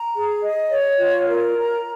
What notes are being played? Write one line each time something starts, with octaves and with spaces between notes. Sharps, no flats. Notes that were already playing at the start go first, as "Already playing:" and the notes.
Already playing: A#5
G#4
D#5
C#5
F4
A#4
A#5